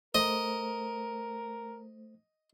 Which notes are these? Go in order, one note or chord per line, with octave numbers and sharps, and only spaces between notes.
A3 A#4 C5 D#5